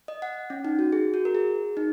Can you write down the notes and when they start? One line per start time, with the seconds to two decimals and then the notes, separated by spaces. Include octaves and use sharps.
0.08 D#5
0.22 F#5
0.50 C#4
0.65 D#4
0.79 F#4
0.92 G#4
1.14 F#4
1.25 A#4
1.35 G#4
1.77 D#4